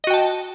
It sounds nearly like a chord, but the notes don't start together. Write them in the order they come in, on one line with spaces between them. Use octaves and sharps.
D#5 F#4 G5 A5